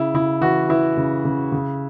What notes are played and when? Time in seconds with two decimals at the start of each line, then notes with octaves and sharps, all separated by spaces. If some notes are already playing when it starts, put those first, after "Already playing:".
Already playing: C#3 E4
0.14 C#3 E4
0.41 E3 F#4
0.69 E3 E4
0.97 C#3
1.25 C#3
1.52 C#3